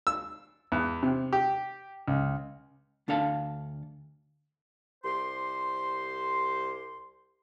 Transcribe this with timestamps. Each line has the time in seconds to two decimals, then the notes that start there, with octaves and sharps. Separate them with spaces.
0.07 E6
0.72 E2
1.03 C3
1.33 G4
2.08 C#2
3.08 D2 D4 A4 F5 A5
5.03 C2 G4 C5 C6